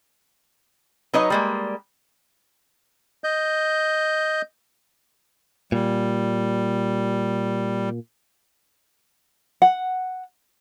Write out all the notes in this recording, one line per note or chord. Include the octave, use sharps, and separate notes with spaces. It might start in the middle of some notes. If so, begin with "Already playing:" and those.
F#3 D#4 B4 C#5 D#5
G3 G#3 A#3
D#5 G6
A#2 G3
F#5